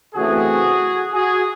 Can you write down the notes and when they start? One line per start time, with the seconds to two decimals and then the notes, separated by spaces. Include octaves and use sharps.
0.14 C#3 E3 A3 C4 F#4 G#4
1.13 F#4 G#4